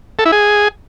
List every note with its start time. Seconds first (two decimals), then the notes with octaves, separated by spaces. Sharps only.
0.19 A4
0.25 E4
0.32 G#4